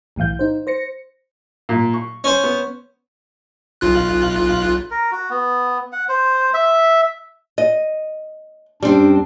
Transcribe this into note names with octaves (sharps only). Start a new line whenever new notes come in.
B1 A2 E3 F5 G6
D#4 C5
C5 A#6 C#7
A#2
C#6
C#4 C5
B3
B1 F4 F#6
A#4
F#4
B3
F#5
C5
E5
D#5
F#2 G3 C4 D4